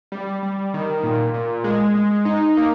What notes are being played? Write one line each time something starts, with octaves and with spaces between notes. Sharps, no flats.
G3
G3
D#3
A#2
A#2
G#3
G#3
D#4
A#3